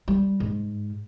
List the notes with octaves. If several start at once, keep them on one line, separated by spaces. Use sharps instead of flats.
G3
G#2